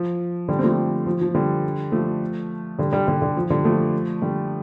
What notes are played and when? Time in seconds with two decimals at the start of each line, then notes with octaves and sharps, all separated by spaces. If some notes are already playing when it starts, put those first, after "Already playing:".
Already playing: F3
0.48 D3 G3
0.59 C4
0.63 F3 A3
1.06 F3
1.21 F3
1.35 D3 G3
1.92 F3 A3
2.78 D3 G3
2.92 D3 G3
3.08 D3 G3
3.22 D3
3.37 F3
3.50 D3 G3
3.64 F3 A3
4.22 D3 G3